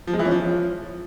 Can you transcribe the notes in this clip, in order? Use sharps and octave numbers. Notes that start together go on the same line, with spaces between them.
F3
G#3
E3
C#4
F3